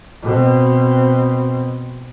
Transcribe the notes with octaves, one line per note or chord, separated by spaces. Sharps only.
B2 C4